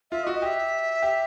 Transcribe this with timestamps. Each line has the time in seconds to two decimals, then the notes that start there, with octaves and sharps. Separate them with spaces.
0.11 F4 E5
0.24 D#5
0.27 F#4
0.34 D#5
0.42 G4 E5
1.02 G4